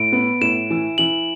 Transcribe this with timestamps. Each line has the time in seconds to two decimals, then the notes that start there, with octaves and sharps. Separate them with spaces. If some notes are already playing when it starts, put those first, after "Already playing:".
Already playing: A2 D7
0.12 B3
0.41 A2 E7
0.70 E3
0.98 E3 F#7